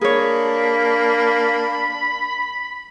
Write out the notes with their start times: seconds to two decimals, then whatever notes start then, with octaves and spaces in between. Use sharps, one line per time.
0.01 A#3 D4 G#4 C#5 B5